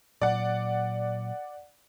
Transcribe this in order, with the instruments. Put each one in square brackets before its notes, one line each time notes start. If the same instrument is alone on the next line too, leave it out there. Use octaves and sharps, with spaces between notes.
[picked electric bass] A#2 F#3 [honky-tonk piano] D5 F#5